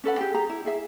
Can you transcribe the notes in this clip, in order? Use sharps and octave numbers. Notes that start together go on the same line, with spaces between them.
C#4 A4 B4 F#5
G4 G#4 G5
G4 G#4 A#5
E4
E4 G#4 E5